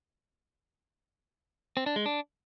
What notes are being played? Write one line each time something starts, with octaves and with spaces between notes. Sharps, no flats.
C4
D4
G#3
D4